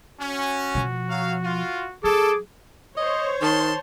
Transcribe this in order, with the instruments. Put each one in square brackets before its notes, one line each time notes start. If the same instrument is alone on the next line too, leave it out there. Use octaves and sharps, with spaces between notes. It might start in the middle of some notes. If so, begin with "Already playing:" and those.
[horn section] C#4 [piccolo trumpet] F#4
[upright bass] B2 F3
[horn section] F#3 F5
F4
[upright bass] F#3 [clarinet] G#4 [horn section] A4 [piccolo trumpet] D6
[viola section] C5 C#5 [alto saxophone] D#5
[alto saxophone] D#3 [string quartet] A5 C6